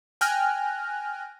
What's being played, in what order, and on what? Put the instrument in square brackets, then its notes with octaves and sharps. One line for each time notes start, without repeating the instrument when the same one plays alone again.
[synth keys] G5 G#5 F6 F#6 A#6